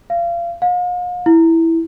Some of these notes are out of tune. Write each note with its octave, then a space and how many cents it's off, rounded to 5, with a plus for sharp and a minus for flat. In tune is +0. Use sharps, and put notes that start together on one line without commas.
F5 -30
F5 +45
E4 -5